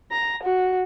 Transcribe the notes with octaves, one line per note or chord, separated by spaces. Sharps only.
A#5
F#4